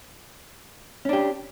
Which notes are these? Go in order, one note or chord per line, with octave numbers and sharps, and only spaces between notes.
C#4 D4 G4